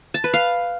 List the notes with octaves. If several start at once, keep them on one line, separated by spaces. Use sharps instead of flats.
A5
B4
F5